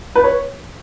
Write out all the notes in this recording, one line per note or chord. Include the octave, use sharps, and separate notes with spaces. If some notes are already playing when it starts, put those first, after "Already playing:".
B4
C#5